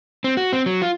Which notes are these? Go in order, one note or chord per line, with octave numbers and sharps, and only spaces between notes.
C4
F#4
C4
F#3
F4